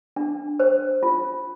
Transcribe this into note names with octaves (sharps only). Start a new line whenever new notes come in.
D4
C5
F4